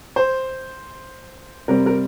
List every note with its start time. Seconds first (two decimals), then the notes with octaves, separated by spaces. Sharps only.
0.16 C5
1.68 C3 G3 C4 A#4
1.86 A#4